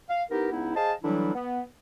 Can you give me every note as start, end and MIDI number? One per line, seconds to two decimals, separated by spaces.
0.09 0.22 77
0.31 0.52 59
0.31 0.52 63
0.31 0.52 64
0.31 0.52 67
0.31 0.52 70
0.52 0.73 37
0.52 0.73 59
0.52 0.73 63
0.52 0.73 64
0.75 0.92 68
0.75 0.92 72
0.75 0.92 75
0.75 0.92 77
0.75 0.92 81
1.03 1.30 50
1.03 1.30 52
1.03 1.30 54
1.03 1.30 55
1.03 1.30 62
1.03 1.30 64
1.34 1.62 59